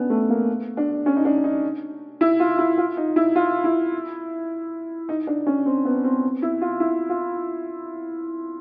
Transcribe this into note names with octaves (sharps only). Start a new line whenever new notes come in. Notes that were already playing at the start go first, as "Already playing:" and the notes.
Already playing: B3 C#4 D4
A3
A#3
D4
C#4
D#4
D4
D#4
E4
F4
E4
F4
D#4
E4
F4
E4
D#4
D4
C#4
C4
B3
C4
E4
F4
E4
F4